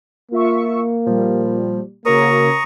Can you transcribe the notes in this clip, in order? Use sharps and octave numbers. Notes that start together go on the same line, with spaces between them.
A#3 F4 E5 C#6
A#2 F3 G3
C#3 A#3 F#4 A#4 C#5 A#5 C#6 D#6